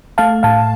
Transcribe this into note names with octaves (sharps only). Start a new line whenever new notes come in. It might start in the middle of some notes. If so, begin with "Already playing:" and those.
A3 F5 A5
A2 F5 A5